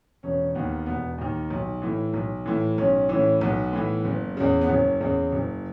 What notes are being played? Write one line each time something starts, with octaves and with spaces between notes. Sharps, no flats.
E1 C#4
D#2 D#3 B3
E1 B3
D#2 D#3
B1
A2 E3
B1
A2 E3
B1 C#4
A2 E3 C#4
B1 B3
A2 E3
F#1
E2 C#3
B3
F#1 C#4
E2 C#3
F#1